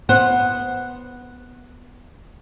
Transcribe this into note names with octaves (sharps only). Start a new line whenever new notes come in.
B3 C5 F#5